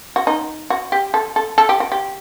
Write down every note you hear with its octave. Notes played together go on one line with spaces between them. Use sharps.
F#4
D#4
F#4
G4
A4
A4
A4
G4
F#4
G4